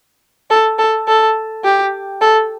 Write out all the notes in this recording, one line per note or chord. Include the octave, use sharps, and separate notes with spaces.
A4
A4
A4
G4
A4